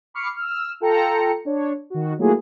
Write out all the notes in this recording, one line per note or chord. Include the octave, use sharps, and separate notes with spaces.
B5 C#6 D6 F6 C7 C#7
E6 F6
F4 A4 G5 A#5 C#7
D4 C#5
D#3 F#4
F#3 A3 A#3 E4 F4 G#4